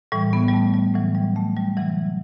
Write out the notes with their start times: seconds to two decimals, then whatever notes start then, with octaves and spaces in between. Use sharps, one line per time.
0.12 A2 E3 G3
0.33 B3
0.48 G3
0.53 A3
0.74 G3
0.94 A2 E3 F#3
1.15 G3
1.36 A3
1.57 G3
1.77 C3 E3 F#3